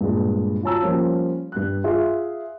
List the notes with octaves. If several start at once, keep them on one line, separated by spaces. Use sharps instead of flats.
G2 A#2 G#3
F4 F#4 C#5 A5 A#5 E6
F3 G3 A#3 C#4
G2 F#6
F4 G#4 E5 C6